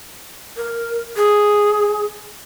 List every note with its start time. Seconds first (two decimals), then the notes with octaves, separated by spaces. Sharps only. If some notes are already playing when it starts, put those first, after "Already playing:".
0.57 A#4
1.17 G#4